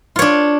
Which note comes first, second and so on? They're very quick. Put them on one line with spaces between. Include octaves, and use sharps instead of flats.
F4 C#5 D4